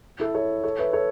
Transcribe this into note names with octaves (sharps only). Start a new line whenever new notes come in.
E4 A4
A4 C#5
A4 C#5
B4 E5
A4 C#5